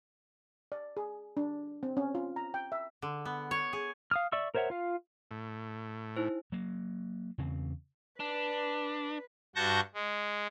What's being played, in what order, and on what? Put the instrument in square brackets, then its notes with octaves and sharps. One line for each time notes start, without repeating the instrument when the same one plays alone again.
[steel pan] D5
G#4
D4
C4
C#4
F4
A#5
G5
E5
[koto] D3
B3
C#5
G#4
[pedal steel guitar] F5 D#6 F6
D5 E5 C#6 E6
A#4 C5 C#5 E5 F#5
F4 F5
[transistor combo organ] A2
[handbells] D#4 E4 C5
[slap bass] F#3 A#3
E2 C#3 C4
[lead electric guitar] D4 [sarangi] B4
[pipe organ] G2 F#4 A5 C#6 G6 A#6
G#3